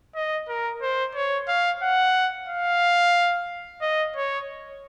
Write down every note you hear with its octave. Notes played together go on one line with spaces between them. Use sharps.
D#5
A#4
C5
C#5
F5
F#5
F5
D#5
C#5